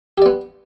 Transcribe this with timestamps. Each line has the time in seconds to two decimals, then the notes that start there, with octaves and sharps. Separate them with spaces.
0.18 G4
0.22 D5
0.26 B3